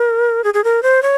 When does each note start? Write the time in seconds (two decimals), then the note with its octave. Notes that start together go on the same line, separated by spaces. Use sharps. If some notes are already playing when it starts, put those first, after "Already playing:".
Already playing: A#4
0.44 G#4
0.54 G#4
0.64 A#4
0.83 C5
1.03 C#5